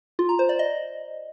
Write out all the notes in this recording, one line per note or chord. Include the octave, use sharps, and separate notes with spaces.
F4
A#5
C5
D5
D#5